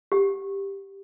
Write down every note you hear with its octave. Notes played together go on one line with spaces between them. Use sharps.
G4 F#5